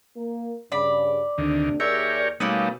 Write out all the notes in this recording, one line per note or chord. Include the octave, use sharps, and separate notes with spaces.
A#3 A#4
G2 C#3 D5 B5
D2 C3 D#3 A3 D4
D#2 G4 G#4 A#4 C#5 D5 E5
B2 G3 A3 A#3 C#4 D#4 B4